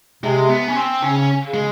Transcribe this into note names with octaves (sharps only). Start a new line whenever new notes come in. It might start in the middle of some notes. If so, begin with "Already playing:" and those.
C3 G#3
B3
C#4
C4
C#3 C#4
C#3
G#3